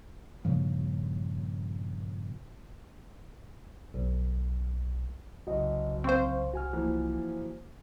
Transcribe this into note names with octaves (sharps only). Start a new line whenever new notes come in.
G2 A#2 C#3 F3
B1
F#1 C2 F#4 D#5
C4 C5 F5 C6 C#6
F#4 G#5 F6
E3 F3 A#3